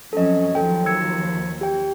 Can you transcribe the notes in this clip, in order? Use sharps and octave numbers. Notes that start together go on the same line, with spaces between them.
F2 F#3 C#4 A4 D#5
D#2 F3 F#3 A4 G5
E6 G#6 C#7
G4 G5